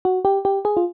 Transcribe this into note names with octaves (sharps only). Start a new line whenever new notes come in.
F#4
G4
G4
G#4
F4